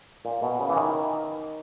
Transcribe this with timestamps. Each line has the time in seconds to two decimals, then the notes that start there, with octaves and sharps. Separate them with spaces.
0.25 A#2
0.42 B2
0.60 C#3
0.69 E3
0.77 D#3